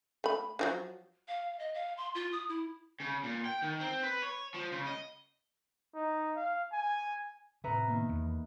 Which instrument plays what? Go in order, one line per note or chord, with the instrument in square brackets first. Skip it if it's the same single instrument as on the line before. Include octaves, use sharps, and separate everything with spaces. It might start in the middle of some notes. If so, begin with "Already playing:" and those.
[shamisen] A3 B5
D3 F3 F#3
[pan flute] F5
D#5
F5
C6
F4
D#6
E4
[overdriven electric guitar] C#3
A#2
G5
D#3
C4
B4
C#5
F3
C#3
D#5
[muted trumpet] D#4
F5
G#5
[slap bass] A2 C3 [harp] B4 E5 A#5
[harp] D#3 A#3 B3
[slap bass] E2